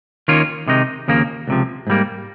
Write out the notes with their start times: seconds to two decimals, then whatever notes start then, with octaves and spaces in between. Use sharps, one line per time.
0.28 D#2 D#3 A#3 C#4 F4
0.68 C3 D#3 G#3 D#4
1.08 D#2 C#3 F3 A#3
1.48 C#2 C3 F3
1.87 G#2 G3 A#3